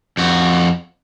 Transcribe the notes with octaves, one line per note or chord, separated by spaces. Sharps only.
F2 F#4